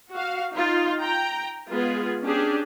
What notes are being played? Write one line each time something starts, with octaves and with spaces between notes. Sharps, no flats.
F#4 F5
D#4 F4
G5 A#5
G#3 B3 F4 G#4
C#4 D4 G4 G#4